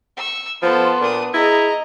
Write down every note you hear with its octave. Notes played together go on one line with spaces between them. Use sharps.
C#6 E6
F3 B3 A4 C6
A#2 D4 D#6
E4 G#4 D#5 A#5